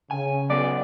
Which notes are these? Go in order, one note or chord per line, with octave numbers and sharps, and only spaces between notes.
C#3 G#5
F#3 B3 D5